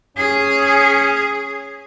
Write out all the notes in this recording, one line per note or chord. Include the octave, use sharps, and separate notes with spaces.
C#4 G#4